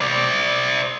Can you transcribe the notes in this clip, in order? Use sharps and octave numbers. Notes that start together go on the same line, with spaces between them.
C5 D5